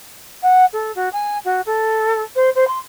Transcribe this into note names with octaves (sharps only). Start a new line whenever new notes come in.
F#5
A4
F#4
G#5
F#4
A4
C5
C5
C6